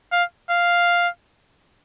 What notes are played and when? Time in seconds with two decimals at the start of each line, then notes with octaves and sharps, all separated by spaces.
0.12 F5
0.50 F5